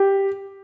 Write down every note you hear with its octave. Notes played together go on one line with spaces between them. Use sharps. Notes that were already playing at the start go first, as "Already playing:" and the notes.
Already playing: G4